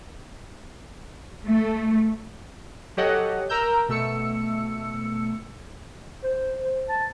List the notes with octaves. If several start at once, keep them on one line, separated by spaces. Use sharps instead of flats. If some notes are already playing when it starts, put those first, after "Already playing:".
A3
F#3 G4 A4 C#5 D#5 F#5
A#4 A#5 E6 G6
B2 A3 E6 C#7
C5
C5
A5